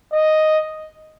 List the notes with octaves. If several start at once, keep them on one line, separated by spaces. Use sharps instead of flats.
D#5